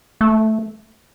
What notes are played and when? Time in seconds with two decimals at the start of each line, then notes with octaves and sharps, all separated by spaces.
0.21 A3